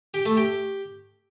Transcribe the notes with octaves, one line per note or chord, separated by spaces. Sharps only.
G4
A3
G4